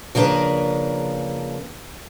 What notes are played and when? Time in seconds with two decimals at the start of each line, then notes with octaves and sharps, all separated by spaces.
0.15 C#3 F3 A#3 D4 A#4 B4